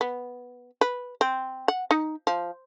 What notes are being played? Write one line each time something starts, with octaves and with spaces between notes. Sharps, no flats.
B3
B4
C4
F#5
D#4
F3